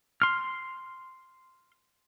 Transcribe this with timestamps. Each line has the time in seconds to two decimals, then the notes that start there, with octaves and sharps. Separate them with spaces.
0.22 C6 F6